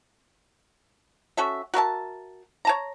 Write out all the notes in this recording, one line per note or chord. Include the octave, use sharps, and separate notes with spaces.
C#4 F#4 A4 E5
F#4 A#4 E5 A5
C#5 A5 A#5